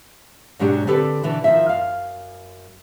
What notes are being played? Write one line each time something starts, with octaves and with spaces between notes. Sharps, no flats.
G#2 B2 F#3 D4 G4
D3 C4 G4 A4 B4
B2 D3 E3
D#3 F3 E5
F#2 F5